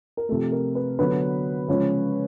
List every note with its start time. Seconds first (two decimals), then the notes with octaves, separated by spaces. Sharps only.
0.17 A#4
0.29 C3 F3 A3 A4
0.52 A#4
0.75 B4
0.99 D3 F#3 B3 B4
1.68 C#3 F3 G#3 C#4